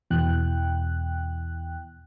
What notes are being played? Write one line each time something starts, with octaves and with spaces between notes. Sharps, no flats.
E2 B2 E3 G5 F#6